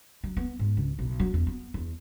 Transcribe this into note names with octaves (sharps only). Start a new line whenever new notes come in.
F#3
B3
G#2
C#2
B1
F#3
E2
B3
E2